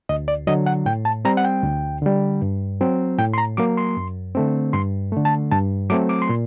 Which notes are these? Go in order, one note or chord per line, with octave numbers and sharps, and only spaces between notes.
D2 D#5
D5
D3 F#3 D#5
F#5
A2 G5
A5
G3 C4 A#5
F#5
G5
D2
D3 G3
G2
F#3 C4
A2 G5
C6
A#5
F#3 A#3 D6
C6
F#2
D3 A3 C4
G2 C6
D3 A3
A5
G2 A5
F#3 A3 C4 D6
D6
C6
A#2